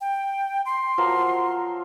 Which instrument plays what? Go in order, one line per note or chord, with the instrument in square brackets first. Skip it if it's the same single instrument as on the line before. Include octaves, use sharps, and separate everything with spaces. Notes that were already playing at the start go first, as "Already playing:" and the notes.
[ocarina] G5
C6
[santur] F3 F#3 A#4